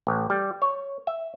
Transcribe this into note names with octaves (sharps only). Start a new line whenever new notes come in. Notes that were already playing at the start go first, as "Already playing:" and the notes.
A1
G3
C#5
E5